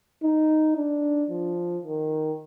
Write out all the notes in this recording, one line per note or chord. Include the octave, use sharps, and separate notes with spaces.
D#4
D4
F3
D#3